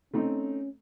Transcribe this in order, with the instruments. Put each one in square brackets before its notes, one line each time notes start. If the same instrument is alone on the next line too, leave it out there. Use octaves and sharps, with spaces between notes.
[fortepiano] A3 C4 D#4 [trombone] C#4